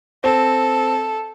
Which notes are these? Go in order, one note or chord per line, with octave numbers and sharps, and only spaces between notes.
C4 A4